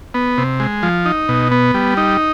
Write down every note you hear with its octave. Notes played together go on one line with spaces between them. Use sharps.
B3
C3
G#3
F3
D#4
B2
B3
G3
D#4